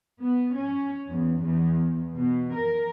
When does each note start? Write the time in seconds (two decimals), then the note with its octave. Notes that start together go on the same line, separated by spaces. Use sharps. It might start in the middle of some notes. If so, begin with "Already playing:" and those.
0.19 B3
0.56 C#4
1.08 E2
1.40 E2
2.15 B2
2.54 A#4